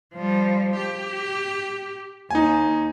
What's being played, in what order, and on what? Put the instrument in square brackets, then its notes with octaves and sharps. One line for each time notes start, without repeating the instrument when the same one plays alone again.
[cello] F3 G3
G4
[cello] D#2 [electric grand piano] D#4 G#5